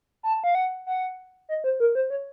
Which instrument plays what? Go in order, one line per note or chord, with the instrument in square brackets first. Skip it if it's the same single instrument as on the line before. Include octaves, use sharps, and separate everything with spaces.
[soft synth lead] A5
F5
F#5
F#5
D#5
C5
A#4
C5
C#5